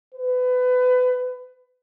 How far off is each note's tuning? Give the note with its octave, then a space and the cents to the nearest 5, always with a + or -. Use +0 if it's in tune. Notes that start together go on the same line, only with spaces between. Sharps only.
B4 +25